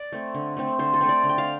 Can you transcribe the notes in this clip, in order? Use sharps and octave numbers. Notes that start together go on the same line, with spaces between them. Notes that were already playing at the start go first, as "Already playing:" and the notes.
Already playing: D5
A3 C4
D3
A3 C4
D3 C5
A4
A3 C4
D5
D3
G5
F5